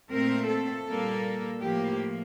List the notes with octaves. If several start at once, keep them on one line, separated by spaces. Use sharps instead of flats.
A#2 A3 C4 A#4
A4
A#2 G3 A#3
A2 F3 A#3 G4